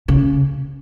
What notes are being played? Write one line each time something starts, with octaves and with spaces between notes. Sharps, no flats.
C#3